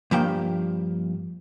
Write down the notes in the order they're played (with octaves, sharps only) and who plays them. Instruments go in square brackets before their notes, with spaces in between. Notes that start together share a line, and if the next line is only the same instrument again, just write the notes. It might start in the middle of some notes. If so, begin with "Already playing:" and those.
[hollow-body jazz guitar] G2 F3 A#3 G5